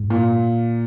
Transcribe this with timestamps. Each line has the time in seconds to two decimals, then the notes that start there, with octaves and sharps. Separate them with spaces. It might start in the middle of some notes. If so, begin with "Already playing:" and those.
Already playing: G#2
0.10 A#2